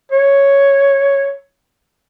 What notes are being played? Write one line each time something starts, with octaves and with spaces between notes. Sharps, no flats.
C#5